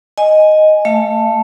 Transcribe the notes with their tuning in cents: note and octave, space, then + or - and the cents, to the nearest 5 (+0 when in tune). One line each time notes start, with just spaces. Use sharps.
D#5 +0 G#5 +0
A3 +0 F5 -45 A5 +0